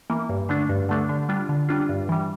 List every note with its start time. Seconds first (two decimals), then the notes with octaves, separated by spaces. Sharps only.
0.10 E3 A#3
0.29 G2
0.49 D3 A3 D4
0.69 G2
0.89 D3 A3 D4
1.09 D3
1.29 G3 D4 F4
1.49 D3
1.69 G3 D4 F4
1.89 G2
2.09 E3 G3